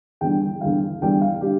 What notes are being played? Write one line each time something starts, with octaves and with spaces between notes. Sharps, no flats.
E2 D3 G3 G5
E2 D3 G3 F5
E2 D3 G3 G5
F5
D3 G3 G4